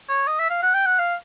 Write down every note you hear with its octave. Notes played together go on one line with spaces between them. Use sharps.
C#5
D#5
E5
F5
F#5
G5
F#5
F5